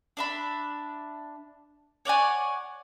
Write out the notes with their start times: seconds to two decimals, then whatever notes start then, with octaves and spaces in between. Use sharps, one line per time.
0.17 D4 E5 B5
2.05 C#5 D5 F#5 G#5